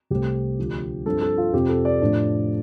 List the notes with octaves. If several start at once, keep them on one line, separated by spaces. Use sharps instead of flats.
C2 C3 A3 C4 G4
D2 D3 F3
G2 F3 C4 A4
A4
F4
F2 C3 F3 C4 G4
A4
D5
A2 F3 D4